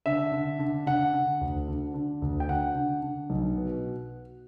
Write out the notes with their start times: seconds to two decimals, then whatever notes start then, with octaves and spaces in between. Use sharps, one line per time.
0.06 D3 E5
0.32 D3
0.59 D3
0.86 D3 F#5
1.14 D3
1.41 D2
1.68 D3
1.94 D3
2.22 D2
2.40 G5
2.49 D3 F#5
2.75 D3
3.03 D3
3.30 B1
3.57 B2